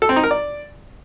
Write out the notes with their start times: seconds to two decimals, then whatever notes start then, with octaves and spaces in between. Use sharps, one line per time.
0.02 A4
0.09 C4
0.16 D#4
0.24 A#4
0.31 D5